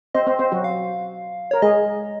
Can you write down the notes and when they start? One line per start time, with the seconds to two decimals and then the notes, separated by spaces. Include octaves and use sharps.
0.14 C4 C5 D#5
0.27 C4 C5
0.39 C4 C5
0.52 F#3 F#4
0.64 F5
1.51 A#4 C#5
1.62 G#3 G#4 D#5